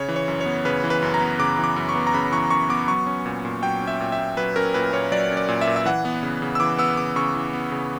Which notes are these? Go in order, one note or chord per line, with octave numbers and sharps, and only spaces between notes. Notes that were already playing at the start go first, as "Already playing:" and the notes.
Already playing: C#3 C#5
E3
C#5
F#2
C#5
B3
C#3 B4
E3
B4
F#2
A#5
B3
C#3 D6
E3
D6
F#2
C#6
B3
A#5
C#3 B5
E3 C#6
F#2 C#6
B3 D6
F#3 C#6
C#4
A#2
A#2
F#3 G5
C#4
E5
A#2
E5
A#2
F#3 B4
C#4 A#4
A#2 B4
A#2 C#5
F#3 D5
C#4
D5
A#2
E5
A#2
E5
E3 F#5
B3
C#3
C#3
E6
E3 D6
B3 E6
C#3 D6
C#3 C#6
E3
B3
C#3